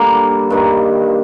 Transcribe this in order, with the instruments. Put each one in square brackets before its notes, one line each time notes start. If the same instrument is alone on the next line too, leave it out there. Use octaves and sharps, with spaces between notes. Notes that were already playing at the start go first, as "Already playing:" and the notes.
Already playing: [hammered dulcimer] D3 G3 A#3
G2 D#3 G3